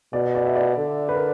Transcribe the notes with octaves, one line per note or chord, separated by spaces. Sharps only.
B2 D5
D5
E5
D5
D3
B4
A#4